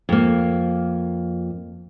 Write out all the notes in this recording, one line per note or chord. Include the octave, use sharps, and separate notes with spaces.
F2 A#3